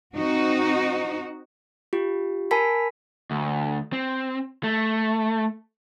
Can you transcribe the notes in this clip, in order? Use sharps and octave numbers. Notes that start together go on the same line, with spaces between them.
C4 D#4 F#4
F4 G4
A#4 G#5 A5 B5 B6
D2
C4
A3